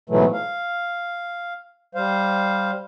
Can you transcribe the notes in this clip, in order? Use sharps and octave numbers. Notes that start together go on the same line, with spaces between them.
G#2 B2 E3 F#3 A3
F5
G3 C5 F5